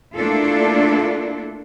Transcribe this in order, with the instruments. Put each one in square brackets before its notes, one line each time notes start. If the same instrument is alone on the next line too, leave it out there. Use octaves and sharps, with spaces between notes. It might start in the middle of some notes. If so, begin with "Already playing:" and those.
[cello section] A3 A#3 D4 E4 F4 A4